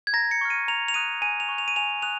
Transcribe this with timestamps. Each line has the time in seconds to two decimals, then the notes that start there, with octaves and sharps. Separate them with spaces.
0.07 G#6
0.13 A#5 A#6
0.31 C#7
0.41 C#6 F6
0.50 D#7
0.68 A#5 F7
0.88 F7
0.94 D#6 F#6 D#7
1.22 G#5 D#7
1.40 F7
1.49 C#6 F#6
1.58 F7
1.68 D#7
1.76 G#5 F7
2.02 D#6 F#6 F7